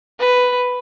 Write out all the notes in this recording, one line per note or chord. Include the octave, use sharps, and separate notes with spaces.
B4